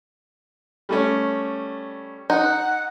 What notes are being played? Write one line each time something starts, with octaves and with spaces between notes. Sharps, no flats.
G3 A3 C#4
D#4 F#5